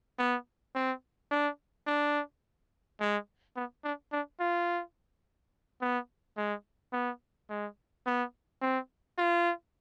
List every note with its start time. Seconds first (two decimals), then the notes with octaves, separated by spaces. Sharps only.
0.19 B3
0.75 C4
1.31 D4
1.87 D4
3.00 G#3
3.56 B3
3.84 D4
4.12 D4
4.40 F4
5.82 B3
6.37 G#3
6.93 B3
7.50 G#3
8.06 B3
8.62 C4
9.18 F4